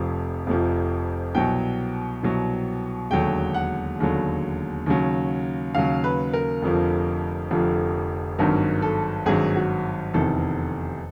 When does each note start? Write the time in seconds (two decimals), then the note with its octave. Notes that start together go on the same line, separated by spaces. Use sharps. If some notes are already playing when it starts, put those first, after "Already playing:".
Already playing: F1 F2 C3 F3
0.47 F1 F2 C3 F3
1.34 C2 B2 F#3 G5
2.23 C2 B2 F#3
3.10 E1 D#2 D3 F#3 G5
3.54 F#5
3.99 E1 D#2 D3 F#3
4.86 D#2 C#3 F#3
5.75 D#2 C#3 F#3 F5
6.04 B4
6.33 A#4
6.62 F1 F2 D3 F3
7.51 F1 F2 D3 F3
8.39 G#1 G2 D#3 F#3 A#4
8.82 A4
9.26 G#1 G2 D#3 F#3 G#4
9.56 F#4
10.14 F1 E2 C3 D#3 A4